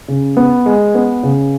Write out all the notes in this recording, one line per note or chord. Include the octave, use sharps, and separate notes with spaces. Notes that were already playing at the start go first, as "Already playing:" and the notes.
C#3
B3
G#3
B3
C#3